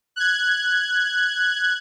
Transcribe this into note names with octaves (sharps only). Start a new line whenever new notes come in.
F#6 G#6